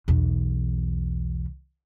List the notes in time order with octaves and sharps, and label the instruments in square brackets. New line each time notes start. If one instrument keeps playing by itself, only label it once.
[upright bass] B1 E2